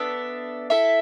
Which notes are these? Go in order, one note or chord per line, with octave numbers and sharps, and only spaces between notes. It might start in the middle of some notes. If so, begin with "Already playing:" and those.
Already playing: B3 D4 A4 E5
E4 A4 E5